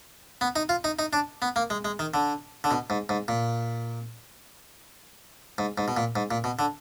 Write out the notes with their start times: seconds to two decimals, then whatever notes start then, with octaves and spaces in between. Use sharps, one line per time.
0.41 B3
0.56 D#4
0.69 F4
0.84 D#4
0.99 D#4
1.13 D4
1.42 B3
1.56 A#3
1.70 G#3
1.85 G#3
1.99 D#3
2.14 D3
2.64 D3
2.71 B2
2.90 G#2
3.09 G#2
3.28 A#2
5.58 G#2
5.78 G#2
5.88 B2
5.97 A#2
6.16 G#2
6.31 A#2
6.44 B2
6.59 D3